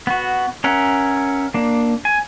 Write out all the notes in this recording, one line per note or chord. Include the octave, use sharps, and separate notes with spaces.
B3 F#4
C#4 A#4 E5 F#5
A#3 D4
G#5